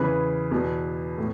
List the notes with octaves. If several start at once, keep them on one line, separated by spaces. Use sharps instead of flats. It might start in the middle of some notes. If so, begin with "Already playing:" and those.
Already playing: E2 C#3 E3 G#4 B4
E2 B2
A2